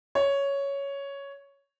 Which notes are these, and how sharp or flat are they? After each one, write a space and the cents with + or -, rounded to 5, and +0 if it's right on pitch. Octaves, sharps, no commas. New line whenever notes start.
C#5 +5